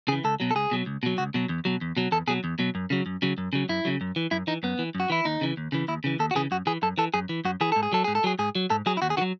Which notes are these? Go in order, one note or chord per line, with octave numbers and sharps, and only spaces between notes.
C#3 E3 G#4
C#2 A4
B2 F#3
A4
C#2 G#4
B2 F#3
C#2
B2 F#3
C#2 F#4
B2 F#3
E2
B2 F#3
E2
B2 F#3
E2 A4
B2 F#3 G#4
E2
B2 F#3
F#2
C#3 F#3
F#2
C#3 F#3
F#2
C#3 F#3
F#2 E4
C#3 F#3
F#2
E3
F#2 E4
E3 D#4
F#2 B3
E3
F#2
F#4
E3 E4
D#2 D#4
C#3 E3
D#2
C#3 E3
D#2 E4
C#3 E3
D#2 A4
F#4
C#3 E3 G#4
F#2 F#4
E3 G#4
F#2 A4
E3 A4
F#2 G#4
E3
F#2 F#4
E3 G#4
G#2 A4
G#4
F#3 A4
G#2 G#4
A4
F#3 G#4
G#2 G#4
F#3
G#2 A4
F#3 G#4
E4
D#2 F#4
G#4
D#3 F#4
F#3